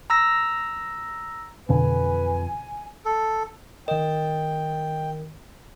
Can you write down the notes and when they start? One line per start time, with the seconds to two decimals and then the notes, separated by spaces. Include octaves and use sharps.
0.10 A#5 E6 A#6
1.69 F2 B2 D3 E3 B4 G#5
3.05 A4
3.88 D#3 A#4 D#5 G5